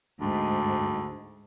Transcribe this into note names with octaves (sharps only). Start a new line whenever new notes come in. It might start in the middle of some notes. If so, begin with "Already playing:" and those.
D2 G#2